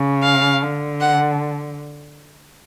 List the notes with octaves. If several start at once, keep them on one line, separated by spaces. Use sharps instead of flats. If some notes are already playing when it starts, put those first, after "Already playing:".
Already playing: C#3
F5
D3
F#5